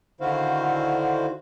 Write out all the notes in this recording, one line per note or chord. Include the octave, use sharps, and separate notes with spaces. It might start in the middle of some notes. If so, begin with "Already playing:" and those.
D3 D#3 E4 F#4 C5 F5